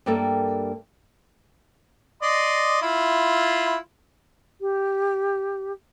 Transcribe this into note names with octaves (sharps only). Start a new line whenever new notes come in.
G2 G3 A#3 A4 A#4 E5
D5 D#5 C6
E4 F4
G4